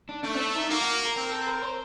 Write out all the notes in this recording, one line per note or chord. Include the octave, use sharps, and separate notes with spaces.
D4
A3 D4
C4
D4
D#4
A#3 F#4
F#4
A#4
C4 A#4
A4
A#4
C5